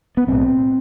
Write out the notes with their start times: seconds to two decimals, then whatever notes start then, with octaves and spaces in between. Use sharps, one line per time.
0.17 B3
0.27 B1 A2 C4